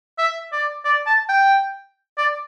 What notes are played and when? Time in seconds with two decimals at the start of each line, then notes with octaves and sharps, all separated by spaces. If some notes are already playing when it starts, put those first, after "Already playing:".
0.18 E5
0.52 D5
0.84 D5
1.06 A5
1.29 G5
2.17 D5